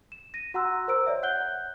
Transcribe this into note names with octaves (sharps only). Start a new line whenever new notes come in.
E7
A#6 D#7
F#4 F#5 A#5 C6 E6 F#6
A#4 C5 A#5 E6 D7
C#5 D5 E5
F#5 F#6 G6 G7